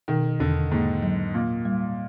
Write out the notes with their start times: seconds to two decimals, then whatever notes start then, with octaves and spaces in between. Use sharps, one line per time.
0.08 B2 D#3
0.40 E2 D3
0.71 G#2 A#3
1.02 F#3
1.34 A#2 A#3
1.65 G3